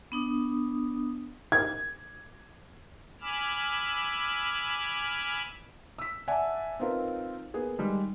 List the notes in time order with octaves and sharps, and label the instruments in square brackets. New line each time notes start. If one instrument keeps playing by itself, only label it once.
[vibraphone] B3 D4 D#6
[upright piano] G#6
[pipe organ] G#5 B5 D6 E6 F6
[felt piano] E6 B6
D5 E5 F#5 G#5 A5
C4 D#4 F4 A#4 B4
A#3 B3 G#4
D#3 G3 G#3